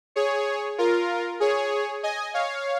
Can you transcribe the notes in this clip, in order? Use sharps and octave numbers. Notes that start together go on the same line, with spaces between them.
G#4 C#5
F4 A#4
G#4 C#5
D#5 G#5
C#5 F5